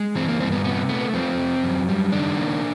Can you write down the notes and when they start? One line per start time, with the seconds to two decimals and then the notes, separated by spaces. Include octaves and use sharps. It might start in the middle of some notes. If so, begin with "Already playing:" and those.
Already playing: G#3
0.15 E3 C4
0.28 A#3
0.40 G2 C4
0.52 B3
0.64 C3 B3
0.89 A3 B3
1.14 F3 C4
1.38 C3
1.64 F#2
1.89 G3
2.12 D#3 D4
2.38 A#3